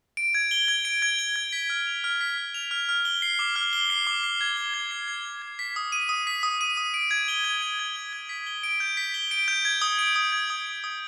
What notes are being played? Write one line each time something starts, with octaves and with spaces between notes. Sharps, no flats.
D7
G#6
G7
G#6
D7
G#6
G7
G#6
B6
F6
F7
F6
B6
F6
F7
F6
F6
G7
C7
D6
F6
G7
C7
D6
C7
G#6
G7
G#6
C7
G#6
G7
G#6
B6
D#6
D#7
D#6
B6
D#6
D#7
D#6
D7
G#6
G7
G#6
D7
G#6
G7
G#6
B6
G7
D7
G6
B6
G7
D7
G6
G#6
D#6
D7
D#6
G#6
D#6
D7
D#6